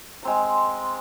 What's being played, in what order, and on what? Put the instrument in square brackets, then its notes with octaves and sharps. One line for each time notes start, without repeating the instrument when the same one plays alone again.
[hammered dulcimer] G#3 C4 A#5